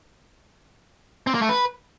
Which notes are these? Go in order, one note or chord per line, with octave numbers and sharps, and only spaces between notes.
C4
A#3
A3
B4